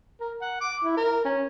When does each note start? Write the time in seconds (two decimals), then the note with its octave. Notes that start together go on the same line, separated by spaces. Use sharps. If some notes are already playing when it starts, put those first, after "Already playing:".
0.20 A#4
0.41 F#5
0.61 D6
0.84 E4
0.97 A#4
1.25 C#4